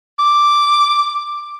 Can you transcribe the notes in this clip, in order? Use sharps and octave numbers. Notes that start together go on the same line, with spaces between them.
D6